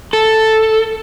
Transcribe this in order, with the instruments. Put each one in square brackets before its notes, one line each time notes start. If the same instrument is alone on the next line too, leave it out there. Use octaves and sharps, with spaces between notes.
[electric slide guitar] A4